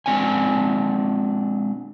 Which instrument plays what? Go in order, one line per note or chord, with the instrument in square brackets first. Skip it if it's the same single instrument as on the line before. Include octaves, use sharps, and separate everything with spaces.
[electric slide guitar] G#3 C4 D4 F#5 G#5